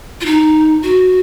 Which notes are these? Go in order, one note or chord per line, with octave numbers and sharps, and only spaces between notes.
F4
D#4
F#4